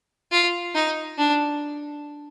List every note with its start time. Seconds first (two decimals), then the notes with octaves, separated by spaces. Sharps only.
0.32 F4
0.75 D#4
1.18 D4